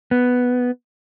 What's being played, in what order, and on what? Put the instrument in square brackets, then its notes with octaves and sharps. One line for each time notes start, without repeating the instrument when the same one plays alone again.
[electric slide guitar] B3